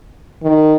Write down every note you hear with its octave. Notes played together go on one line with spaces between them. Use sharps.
D#3